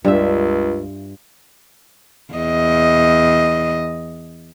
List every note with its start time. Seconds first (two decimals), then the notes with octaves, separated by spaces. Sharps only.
0.05 C#2 G2 F4 E5
2.34 E2 D#5